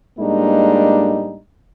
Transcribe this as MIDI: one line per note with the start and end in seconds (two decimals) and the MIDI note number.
0.19 1.38 45
0.19 1.38 55
0.19 1.38 56
0.19 1.38 58
0.19 1.38 62
0.19 1.38 63